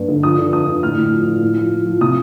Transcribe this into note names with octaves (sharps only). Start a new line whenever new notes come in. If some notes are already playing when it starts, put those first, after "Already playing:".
Already playing: G2
D3
F3 D#6
D3
F2 D#6
D3
A2 F6
A2
F3
F3
A2
F3
F3
F3
C3 D#6